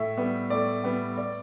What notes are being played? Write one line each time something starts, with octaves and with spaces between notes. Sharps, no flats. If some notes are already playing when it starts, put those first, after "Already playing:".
Already playing: A2 E5
G3 B3
A2 D5
G3 B3
D5